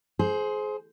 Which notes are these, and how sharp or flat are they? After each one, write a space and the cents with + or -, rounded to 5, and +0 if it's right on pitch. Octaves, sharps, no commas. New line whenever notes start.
G#4 +30 C5 +0